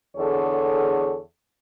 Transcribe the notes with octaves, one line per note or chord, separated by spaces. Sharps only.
E2 D3 G#4 A4 C#5